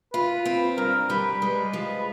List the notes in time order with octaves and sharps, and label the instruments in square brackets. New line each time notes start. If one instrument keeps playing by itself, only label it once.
[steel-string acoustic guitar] F4 [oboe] B4
[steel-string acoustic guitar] C4
[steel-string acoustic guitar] G2 [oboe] A#4
[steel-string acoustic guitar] G3 [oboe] B4
[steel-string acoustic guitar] G#3 [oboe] B4
[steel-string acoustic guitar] F3